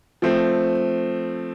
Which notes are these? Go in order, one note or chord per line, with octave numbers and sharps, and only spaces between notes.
F3 A3 C4